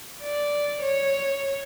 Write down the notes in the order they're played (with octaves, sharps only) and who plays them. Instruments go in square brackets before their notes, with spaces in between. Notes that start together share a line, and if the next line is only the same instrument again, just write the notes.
[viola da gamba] D5
C#5